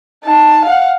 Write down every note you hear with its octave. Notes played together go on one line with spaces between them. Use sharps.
D#4 A5
F5 F#5